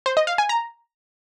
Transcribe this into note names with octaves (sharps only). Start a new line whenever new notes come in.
C5
D#5
F5
G#5
A#5